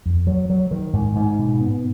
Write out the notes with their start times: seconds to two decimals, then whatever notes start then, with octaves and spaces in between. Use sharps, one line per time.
0.06 F2
0.27 F#3
0.50 F#3
0.71 D#3
0.93 G#2
1.15 G#2
1.39 B2
1.61 B3